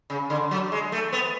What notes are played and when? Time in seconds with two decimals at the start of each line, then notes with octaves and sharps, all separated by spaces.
0.10 C#3
0.30 D3
0.51 F#3
0.72 G#3
0.92 A3
1.13 B3